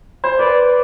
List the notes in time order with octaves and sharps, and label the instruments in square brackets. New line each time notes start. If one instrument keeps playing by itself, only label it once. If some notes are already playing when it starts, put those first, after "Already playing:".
[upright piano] C5
[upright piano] B4 [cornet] D5